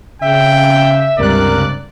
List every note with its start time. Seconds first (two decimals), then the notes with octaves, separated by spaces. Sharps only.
0.22 C#3 E5 G5
1.19 C#2 G2 C3 A#4 D5 F#6